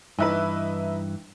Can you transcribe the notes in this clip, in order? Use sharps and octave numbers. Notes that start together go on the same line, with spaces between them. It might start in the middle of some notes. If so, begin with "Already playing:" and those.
G2 E3 D#4 E4 B4